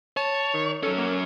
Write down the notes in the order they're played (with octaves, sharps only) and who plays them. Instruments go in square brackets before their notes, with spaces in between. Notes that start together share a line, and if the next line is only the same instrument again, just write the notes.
[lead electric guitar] C#5 [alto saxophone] A5
[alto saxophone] D#3
[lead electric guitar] F#3 C#4 [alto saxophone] A4
[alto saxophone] A#3